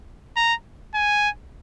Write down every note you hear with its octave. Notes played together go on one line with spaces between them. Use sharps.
A#5
G#5